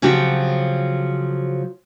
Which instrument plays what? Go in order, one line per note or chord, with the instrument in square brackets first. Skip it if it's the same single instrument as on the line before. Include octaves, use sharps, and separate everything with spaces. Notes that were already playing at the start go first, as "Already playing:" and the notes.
[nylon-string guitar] C#3 F3 F#3 C4 F#4 G4